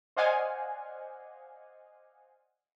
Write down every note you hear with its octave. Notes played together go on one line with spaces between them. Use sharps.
C5 D5 D#5 F5 F#5 G#5